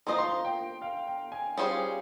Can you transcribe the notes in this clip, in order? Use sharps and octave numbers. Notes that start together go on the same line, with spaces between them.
F3 A#3 F4 C5 D#5 A#5
C6
A#5
G5
F5
G5
G#5
G3 C#4 F4 G#4 C5